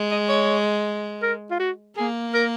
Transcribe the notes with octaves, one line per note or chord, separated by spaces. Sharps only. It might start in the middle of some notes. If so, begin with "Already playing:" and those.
Already playing: G#3
D#5
C#5
A#4
F4
F#4
A#3 G#4
A#4